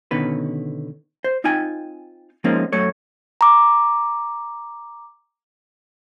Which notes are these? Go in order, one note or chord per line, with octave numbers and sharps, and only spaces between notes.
B2 D3 D#3 C#4 B4
C5
C4 D#4 F4 G5 G#5
F3 G#3 A#3 C4 C#4 D#4
F#2 F#3 A3 C#5
A#5 D6